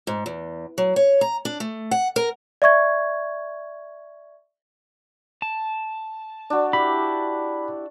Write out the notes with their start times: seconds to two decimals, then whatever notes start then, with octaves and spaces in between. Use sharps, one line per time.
0.07 G#2
0.26 E2
0.78 F#3
0.96 C#5
1.21 A#5
1.45 D4
1.60 A3
1.91 F#5
2.16 A#4
2.62 D5 E5 C#6 G#6
5.42 A5
6.50 D4 F#4
6.73 E4 G4 B5